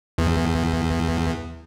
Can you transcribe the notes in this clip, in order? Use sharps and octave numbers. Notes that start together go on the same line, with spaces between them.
E2